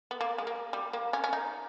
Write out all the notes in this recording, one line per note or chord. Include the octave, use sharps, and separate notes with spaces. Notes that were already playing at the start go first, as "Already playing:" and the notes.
B3
A#3
G#3
A#3
G3
A#3
C#4
C#4
D#4